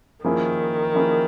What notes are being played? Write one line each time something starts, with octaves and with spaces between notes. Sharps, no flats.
D#3 F3 A#3 C#4 E4 G#4
F3 A#3 C#4 E4 G#4